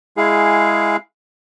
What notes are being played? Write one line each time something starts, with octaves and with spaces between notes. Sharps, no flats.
G#3 E4 G#4 F5